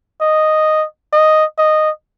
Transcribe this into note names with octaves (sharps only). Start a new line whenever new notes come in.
D#5
D#5
D#5